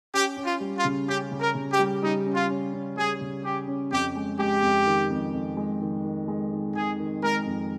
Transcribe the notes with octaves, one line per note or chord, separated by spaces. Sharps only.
C#4 G4
C#4
F4
G3
F4
C#3
C#4 G4
C#3
A#4
C#3
G4
G3
G3 D#4
C#4
F4
C#4
C#4
G3 G#4
C#3
C#4 G4
C#4
F2 G4
G#3
G#3 G4
F2
D#3
F2
F2
G#3
D#3
D#3
G#3
D#3
D#3 G#4
D#3
G#3 A#4
F2